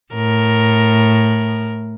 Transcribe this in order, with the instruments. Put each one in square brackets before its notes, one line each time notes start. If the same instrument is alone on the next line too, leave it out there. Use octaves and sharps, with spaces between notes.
[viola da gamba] A2 A#4